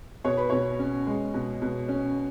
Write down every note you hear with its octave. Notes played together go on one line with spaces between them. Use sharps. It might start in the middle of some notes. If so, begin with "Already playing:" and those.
B2 C#5
B4
B2 C#5
C#4
G#3
B2
B2
C#4